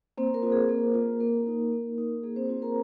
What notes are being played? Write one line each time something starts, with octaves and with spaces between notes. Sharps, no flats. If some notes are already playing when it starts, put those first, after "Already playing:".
A#3 C4 C5
A#4
F4
G#4
A#3 A#4
F4
A#3 A#4
D#4
A#3
D#4
A#3 G#4
C4 C5
C4 F4 C5
A#4 A#5